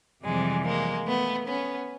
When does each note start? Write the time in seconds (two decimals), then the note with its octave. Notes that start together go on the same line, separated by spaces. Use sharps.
0.25 F2 C3 E3 G3 G#3
0.65 G#3 A#3
1.07 A3 B3
1.47 B3 C#4